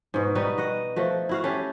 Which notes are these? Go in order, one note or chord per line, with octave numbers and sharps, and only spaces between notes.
G#2 B2
G3 B3 D#4 F#4
F#4 D#5 F#5
F3 A3 F#4
E4 F#4 F5
A3 C#4 G4